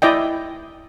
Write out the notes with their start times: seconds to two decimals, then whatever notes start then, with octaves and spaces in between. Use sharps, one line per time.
0.02 E4 D5 D#5 G5